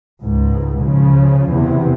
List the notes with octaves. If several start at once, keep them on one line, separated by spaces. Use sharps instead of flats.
C#2 G#2
C#3 F3
E2 C3